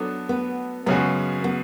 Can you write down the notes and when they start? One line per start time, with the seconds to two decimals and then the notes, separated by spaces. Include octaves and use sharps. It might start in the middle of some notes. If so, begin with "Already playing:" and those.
Already playing: F#3 B3 D4 A4
0.29 B3
0.86 F#2 C#3 G#3 B3 C#4 F#4
1.44 B3